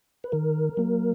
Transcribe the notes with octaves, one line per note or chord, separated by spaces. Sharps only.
B4
D#3 A#4
F#3 A#3